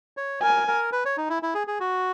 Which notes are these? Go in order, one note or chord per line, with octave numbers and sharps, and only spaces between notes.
C#5
A#4 G#5
A#4
B4
C#5
D#4
E4
E4
G#4
G#4
F#4